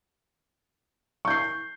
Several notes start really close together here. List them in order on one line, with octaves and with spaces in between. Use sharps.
C#6 G6 C7